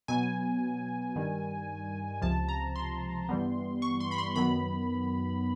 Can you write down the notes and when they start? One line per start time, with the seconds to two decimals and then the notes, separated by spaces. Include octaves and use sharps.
0.08 B2 F#3 B3 G#5
1.15 G2 D#3 G3
2.22 C#2 C3 F3 A5
2.49 A#5
2.76 C6
3.29 G2 E3 G3 B3
3.82 C#6
4.00 C6
4.11 B5
4.18 C6
4.35 F#2 D#3 F#3 B3 B5